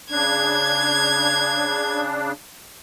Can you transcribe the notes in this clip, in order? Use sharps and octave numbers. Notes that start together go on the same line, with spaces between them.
C#3 D4 G#6